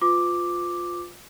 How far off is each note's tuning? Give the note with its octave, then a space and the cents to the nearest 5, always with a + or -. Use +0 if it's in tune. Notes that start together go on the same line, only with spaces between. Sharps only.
F4 +10 B4 +35 D6 +0